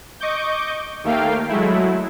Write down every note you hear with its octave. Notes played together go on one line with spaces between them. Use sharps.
D#5 C#6 D6 G6
D#2 A3 A#3 F5 G5
F#3 G#3 A3 E4